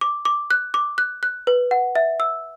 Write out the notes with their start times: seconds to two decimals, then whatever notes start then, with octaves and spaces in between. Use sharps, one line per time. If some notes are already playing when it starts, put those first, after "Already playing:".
0.01 D6
0.25 D6
0.51 F#6
0.74 D6
0.98 F#6
1.23 F#6
1.47 B4
1.71 F#5
1.96 E5
2.20 E6